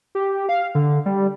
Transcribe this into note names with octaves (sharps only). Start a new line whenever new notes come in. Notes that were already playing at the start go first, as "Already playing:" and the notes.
G4
F5
D3
G3